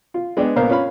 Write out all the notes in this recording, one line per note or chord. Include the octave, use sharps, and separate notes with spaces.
F4
G#3 B3 D4 G5
A#2 B3 A#4 C5 F5
C#4 F4 F5 B5